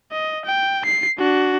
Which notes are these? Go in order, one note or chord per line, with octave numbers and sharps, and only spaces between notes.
D#5
G5
C7
D4 F#4